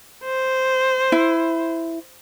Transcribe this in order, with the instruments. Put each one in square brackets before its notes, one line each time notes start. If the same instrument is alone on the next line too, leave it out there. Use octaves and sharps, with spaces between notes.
[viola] C5
[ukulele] E4